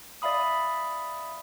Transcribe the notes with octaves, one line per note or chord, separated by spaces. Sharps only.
D5 E5 F5 B5 D#6